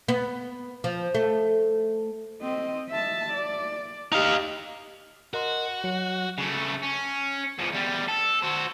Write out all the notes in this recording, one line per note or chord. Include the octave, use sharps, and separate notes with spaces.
B3
F3
A3
C4 D#5
E5 A5
D5
D#4 G4 D#5 F5
F#4 A#4 D#5 C6
F#3 C#7
C#3 A3
C#4
E2 F3
E2 G3
A4
F#4 C5